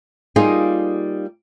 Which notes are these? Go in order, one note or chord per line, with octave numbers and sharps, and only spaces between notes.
G3 A#3 D#4 F4 G#4